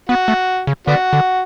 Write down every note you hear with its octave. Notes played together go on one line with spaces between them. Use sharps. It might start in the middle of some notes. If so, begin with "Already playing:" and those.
B3 F#4
A3
C#3
D3 B3 D4 F#4
D3